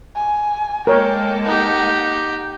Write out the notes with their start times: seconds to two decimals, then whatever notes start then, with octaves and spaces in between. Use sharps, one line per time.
0.15 G#5
0.87 G#3 A#3 A4 A#4 C#5 G5
1.45 D#4 G4 F#5